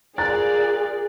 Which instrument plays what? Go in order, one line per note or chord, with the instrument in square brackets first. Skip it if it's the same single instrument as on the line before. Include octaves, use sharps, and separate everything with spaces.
[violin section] F4 A#4 D5 [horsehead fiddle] G#4 [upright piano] A#5 F#6 A6